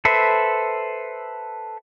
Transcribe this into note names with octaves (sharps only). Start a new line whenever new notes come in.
A4 B4 C5 E5